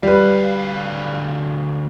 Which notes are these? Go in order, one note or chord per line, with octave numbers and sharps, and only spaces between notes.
D2 G3 B4 F5